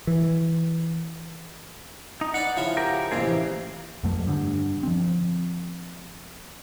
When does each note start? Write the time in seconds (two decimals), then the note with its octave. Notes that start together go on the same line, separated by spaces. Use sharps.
0.07 E3
2.21 D#4
2.34 D#4 B4 D5 F#5
2.56 C#3 F3 E4
2.77 G4 A#4
3.11 A1 F2 C3 A#3 C4 G#4
3.27 E3
4.04 F2 F#3 A3
4.27 G2 D3
4.83 F3 C4